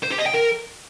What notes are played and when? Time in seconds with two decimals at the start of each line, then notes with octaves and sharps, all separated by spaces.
0.03 C5
0.10 G4
0.18 D#5
0.26 G5
0.34 A#4